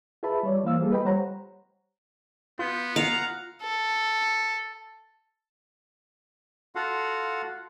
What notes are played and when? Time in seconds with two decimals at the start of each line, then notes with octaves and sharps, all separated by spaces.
0.23 F4 G#4 B4 E5 A5 B5
0.43 G3 C#5 D5
0.64 E3 A#3 C5 F5 E6
0.80 G3 A#3 F4 G#4 A4
0.92 B4 D#5 G5 B5
1.05 G3 C5 C#5 F#5 A#5
2.59 B3 F4 G6
2.96 F5 F#5 A#5
3.62 A4
6.75 F4 F#4 A4 F5 F#5